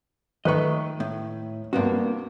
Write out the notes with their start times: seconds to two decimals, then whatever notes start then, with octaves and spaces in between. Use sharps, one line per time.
0.45 D#3 A3 B4 D#5 C#6
1.00 A2
1.73 G2 C3 A#3 B3 F#4